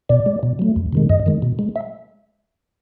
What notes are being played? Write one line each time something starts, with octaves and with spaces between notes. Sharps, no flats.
B2 D5
G#3
B2
F#3 A3
F2
C3 D#3 G#3
F#2 D#5
D#3 G#3
B2
G#3
E5